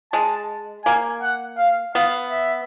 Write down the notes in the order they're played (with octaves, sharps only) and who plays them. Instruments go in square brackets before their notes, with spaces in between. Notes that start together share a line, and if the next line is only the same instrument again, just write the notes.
[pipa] G#3 [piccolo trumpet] A5
[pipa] A#3 [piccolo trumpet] G#5
[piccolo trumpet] F#5
F5
[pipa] B3 [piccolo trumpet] F5
[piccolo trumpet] E5